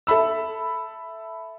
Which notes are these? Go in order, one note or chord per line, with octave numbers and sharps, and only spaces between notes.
A4 E5 B5 E6